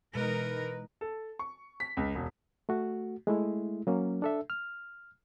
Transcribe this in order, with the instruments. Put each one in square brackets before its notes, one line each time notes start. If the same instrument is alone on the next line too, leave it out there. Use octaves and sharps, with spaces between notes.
[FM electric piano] B2 G#3 [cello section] E3 D#4 A#4 [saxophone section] B4
[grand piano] A4
C#6
B6
C#2
E1
[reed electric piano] A3 F#4
G#3 A3 E4
F#3 A#3 C#4
D4 A4 E5
F6